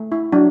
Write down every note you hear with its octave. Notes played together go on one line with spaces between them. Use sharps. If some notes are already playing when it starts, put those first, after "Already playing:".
Already playing: A3
E4
F#3 D4